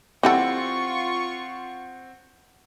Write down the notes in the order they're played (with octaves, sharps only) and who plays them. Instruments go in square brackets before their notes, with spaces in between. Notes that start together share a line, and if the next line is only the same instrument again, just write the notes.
[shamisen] E3 G3 A4 [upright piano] C4 F#5 [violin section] F4 C#6